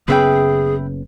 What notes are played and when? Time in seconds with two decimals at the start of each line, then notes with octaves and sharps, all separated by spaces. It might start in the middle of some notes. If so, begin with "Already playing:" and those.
0.08 F#1 C#3 B3 G#4 B4 E5 G5